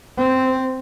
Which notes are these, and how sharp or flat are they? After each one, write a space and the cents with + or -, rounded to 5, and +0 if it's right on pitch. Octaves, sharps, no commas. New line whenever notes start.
C4 -10